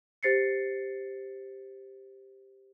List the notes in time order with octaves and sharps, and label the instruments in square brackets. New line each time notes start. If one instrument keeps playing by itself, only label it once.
[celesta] G4 C5 A6 C7 C#7